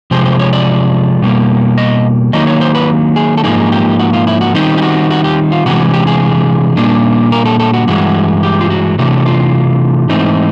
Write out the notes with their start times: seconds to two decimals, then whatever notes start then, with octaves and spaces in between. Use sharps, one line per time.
0.11 C3 F3 G#3 C5
0.25 C5
0.39 C#5
0.53 D5
1.22 B2 G3 A#3
1.78 D#5
2.33 D#3 F#3 A#3 D#4 D#5
2.47 C#5
2.61 C5
2.75 B4
3.16 G#4
3.37 A4
3.44 G#2 F3 A#3 D#4 G#4
3.72 G4
3.99 F#4
4.13 F4
4.27 E4
4.41 F#4
4.54 D#3 G3 C4 D#4 G4
4.78 G4
4.82 F#4
5.11 F#4
5.24 G4
5.52 F4
5.66 C3 E3 G#3 F#4
5.93 G4
6.07 G#4
6.77 A#2 G3 A#3 D4
7.32 A#4
7.46 A4
7.60 A4
7.74 F#4
7.88 G2 E3 G#3 F#4
8.43 G4
8.61 F4
8.70 F#4
8.99 C3 E3 A3 D4 F#4
9.26 F4
10.09 G#2 E3 A3 C4 D#4